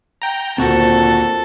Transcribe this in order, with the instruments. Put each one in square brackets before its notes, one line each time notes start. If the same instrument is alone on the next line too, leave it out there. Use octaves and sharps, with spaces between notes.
[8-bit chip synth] G5 A#5
[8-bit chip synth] D2 F#4 [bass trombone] A#2 [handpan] C4 [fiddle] A4